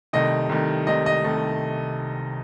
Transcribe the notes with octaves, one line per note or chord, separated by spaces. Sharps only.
C2 C3 D#3 A3 D#5
C2 C3 D#3 A3
C2 C3 D#3 A3 D#5
D#5
C2 C3 D#3 A3